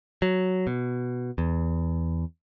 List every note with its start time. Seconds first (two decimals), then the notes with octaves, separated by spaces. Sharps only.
0.22 F#3
0.67 B2
1.38 E2